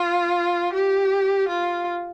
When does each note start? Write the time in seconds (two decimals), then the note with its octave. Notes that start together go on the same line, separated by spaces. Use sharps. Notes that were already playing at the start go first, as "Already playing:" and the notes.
Already playing: F4
0.73 G4
1.49 F4